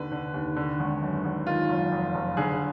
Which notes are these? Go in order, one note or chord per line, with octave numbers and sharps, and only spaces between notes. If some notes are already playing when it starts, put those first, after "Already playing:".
Already playing: D#2 D3 B4
D3
D#2
D3
G#1
F#2
G#1
D#3 F4
F#1
F2
F#1
D3 G#4